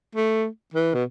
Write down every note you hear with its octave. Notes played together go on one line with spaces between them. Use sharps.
A3
E3
B2